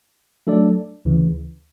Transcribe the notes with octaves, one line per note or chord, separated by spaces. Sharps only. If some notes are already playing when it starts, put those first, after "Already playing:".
F#3 A3 D4 A4 D5
D2 C#3 E3